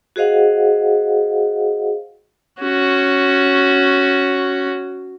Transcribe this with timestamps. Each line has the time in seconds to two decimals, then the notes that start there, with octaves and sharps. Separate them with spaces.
0.16 F#4 G#4 C5 D#5 F5 F#5
2.61 C#4 F#4